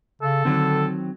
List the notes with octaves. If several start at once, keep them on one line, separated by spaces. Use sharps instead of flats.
C#3 A4
D3 D#3 F#3 C4